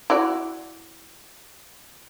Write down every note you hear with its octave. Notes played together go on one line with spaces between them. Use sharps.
E4 F#4 D5